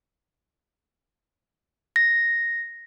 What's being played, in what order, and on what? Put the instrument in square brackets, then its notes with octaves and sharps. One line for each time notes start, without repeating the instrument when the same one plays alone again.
[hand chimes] A#6